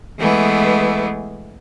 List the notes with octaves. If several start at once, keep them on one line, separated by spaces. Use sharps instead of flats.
E3 G#3 A3 B3 G#4